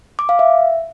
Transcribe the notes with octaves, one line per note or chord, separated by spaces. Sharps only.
D6
F5
E5